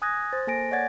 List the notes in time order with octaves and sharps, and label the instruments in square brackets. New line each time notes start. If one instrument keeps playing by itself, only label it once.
[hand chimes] G#5 D#6 F#6 G#6 A#6
C5 A6
A#3 A4 G#5 A#6 D7
C#5 D5 F#5 G#6 A6